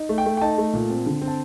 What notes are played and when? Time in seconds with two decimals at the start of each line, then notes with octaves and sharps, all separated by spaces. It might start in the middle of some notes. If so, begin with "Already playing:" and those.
Already playing: D#4
0.09 A3
0.18 G5
0.26 A3
0.37 G5
0.41 D#4 A5
0.58 A3
0.74 A#2
0.90 C4
1.06 D3
1.21 C4
1.28 A5